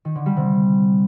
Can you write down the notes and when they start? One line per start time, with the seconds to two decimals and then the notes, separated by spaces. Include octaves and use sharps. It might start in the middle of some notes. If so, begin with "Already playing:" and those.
0.05 D#3
0.15 D3
0.26 G3
0.36 C3